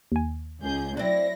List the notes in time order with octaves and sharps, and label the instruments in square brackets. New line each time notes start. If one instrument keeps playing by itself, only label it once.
[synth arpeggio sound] D#2 G#5
[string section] C#2 G#4 G6
[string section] F#3 E4 A#6 [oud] C4 D4